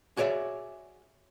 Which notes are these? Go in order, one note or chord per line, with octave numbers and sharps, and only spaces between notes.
F#4 G#4 C#5 D5 E5